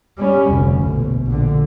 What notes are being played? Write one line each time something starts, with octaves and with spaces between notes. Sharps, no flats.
G3 C#4
F1 D2
A#1 B2
A#1 D3